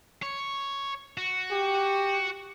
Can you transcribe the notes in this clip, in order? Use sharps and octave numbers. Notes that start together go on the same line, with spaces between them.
C#5
F#4
G4